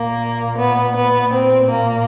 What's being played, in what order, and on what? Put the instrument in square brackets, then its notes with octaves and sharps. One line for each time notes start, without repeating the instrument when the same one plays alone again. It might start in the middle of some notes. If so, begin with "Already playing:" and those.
Already playing: [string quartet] A#2 A#3
B3
B3
A#2 C4
A#3